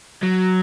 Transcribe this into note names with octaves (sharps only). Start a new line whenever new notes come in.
F#3